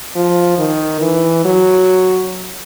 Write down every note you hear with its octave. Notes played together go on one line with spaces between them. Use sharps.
F3
D#3
E3
F#3